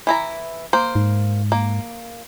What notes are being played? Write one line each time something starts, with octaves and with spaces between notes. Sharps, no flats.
E3 E4 A#5
A#3 C5
G#2
A#3